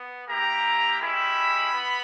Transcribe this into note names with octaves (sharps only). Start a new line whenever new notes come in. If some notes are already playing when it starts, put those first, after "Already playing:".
Already playing: B3
A#3 E4 G4 A#5
G#3 C#4 E4 G4 B5
B3